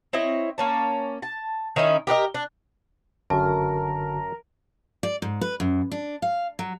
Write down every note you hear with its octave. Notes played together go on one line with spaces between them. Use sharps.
C4 E4 C#5 D#5
A#3 C#4 A5
A5
D#3 C#4 D#4 E4
G4 A#4 B4 D#5
D4
G1 F#2 D3 F#4 A#4 A5
D5
G#2
B4
F#2
D4
F5
F#3